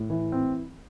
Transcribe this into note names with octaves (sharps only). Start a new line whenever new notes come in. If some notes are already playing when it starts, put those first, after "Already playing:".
Already playing: A2
E3
C4